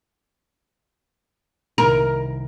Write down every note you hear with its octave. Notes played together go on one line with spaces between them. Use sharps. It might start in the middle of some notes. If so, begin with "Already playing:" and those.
C2 D#3 A#4